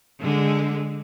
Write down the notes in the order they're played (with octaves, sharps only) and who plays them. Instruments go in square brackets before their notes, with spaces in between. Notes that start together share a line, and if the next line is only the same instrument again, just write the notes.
[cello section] D3 G#3